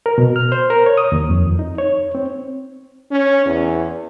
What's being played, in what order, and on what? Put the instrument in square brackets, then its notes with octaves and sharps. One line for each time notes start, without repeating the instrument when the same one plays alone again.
[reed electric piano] A#4
B2
F6
C5
A#4
C#5
D#6
D#2
F2
D#4
C#5
C4
[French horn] C#4
E2